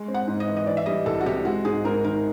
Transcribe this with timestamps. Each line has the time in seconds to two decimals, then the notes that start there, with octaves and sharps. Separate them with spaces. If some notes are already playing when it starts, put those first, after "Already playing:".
Already playing: G#3
0.08 C4
0.14 F#5
0.27 G#2
0.40 D#5
0.47 E3
0.57 D#5
0.66 E3 D5
0.77 E5
0.86 G3 D#5
1.06 C2 A4
1.20 F#4
1.26 C3 G4
1.45 G#3 F#4
1.65 G#2 G#4
1.85 G#2 A#4
2.04 D#3 A#4